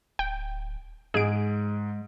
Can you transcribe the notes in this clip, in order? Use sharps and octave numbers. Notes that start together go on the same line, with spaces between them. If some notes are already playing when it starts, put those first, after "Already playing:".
D1 G5
G#2 G#3 G#4 D7